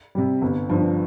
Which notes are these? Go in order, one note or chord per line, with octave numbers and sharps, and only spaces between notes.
C3 G3
G1
G2 F3